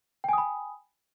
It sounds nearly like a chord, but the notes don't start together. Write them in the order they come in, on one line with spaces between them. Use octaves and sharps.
G5 G#5 D#6 B5